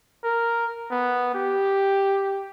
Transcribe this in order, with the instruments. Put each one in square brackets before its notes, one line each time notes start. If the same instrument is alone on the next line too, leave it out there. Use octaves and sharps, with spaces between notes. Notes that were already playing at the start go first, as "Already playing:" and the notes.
[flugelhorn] A#4
B3
G4